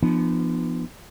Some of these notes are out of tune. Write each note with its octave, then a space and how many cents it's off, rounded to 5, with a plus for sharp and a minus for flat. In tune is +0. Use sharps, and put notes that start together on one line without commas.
F3 -25 B3 +0 D4 +45